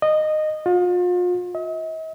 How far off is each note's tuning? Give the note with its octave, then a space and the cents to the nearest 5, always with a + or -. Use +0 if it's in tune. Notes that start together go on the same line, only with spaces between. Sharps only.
D#5 -15
F4 +40
D#5 +45